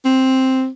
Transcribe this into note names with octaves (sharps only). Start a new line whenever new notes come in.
C4